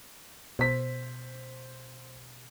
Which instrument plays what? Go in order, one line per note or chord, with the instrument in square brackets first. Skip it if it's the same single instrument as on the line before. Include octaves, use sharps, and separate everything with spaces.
[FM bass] B2 [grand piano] C5 B6